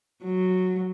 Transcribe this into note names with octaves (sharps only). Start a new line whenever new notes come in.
F#3